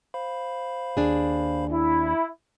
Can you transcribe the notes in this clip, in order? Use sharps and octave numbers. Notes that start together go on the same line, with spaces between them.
C5 F5 B5
D#2 D4 G#4
E4